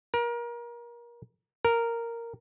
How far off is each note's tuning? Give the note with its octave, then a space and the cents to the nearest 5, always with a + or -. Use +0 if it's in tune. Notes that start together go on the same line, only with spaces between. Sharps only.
A#4 +30
A#4 -5